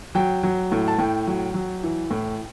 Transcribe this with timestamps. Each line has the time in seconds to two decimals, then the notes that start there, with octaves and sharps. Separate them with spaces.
0.15 F#3 G5
0.43 F#3
0.72 A2
0.88 A5
0.98 A2 G5
1.27 F#3
1.54 F#3
1.83 E3
2.11 A2